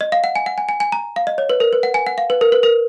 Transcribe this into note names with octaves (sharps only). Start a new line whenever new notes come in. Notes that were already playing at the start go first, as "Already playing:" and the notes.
D#5
F5
F#5
G#5
F#5
G#5
G#5
G#5
A#5
F5
D#5
C#5
B4
A#4
B4
F#5
G#5
F#5
F5
B4
A#4
B4
A#4